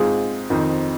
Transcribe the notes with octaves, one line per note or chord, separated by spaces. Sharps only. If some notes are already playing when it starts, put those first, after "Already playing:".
Already playing: G#2 G#3 C4 F4 G#4
F2 D#3 C4 D#4